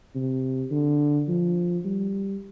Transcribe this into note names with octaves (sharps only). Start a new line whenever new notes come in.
C3
D3
F3
G3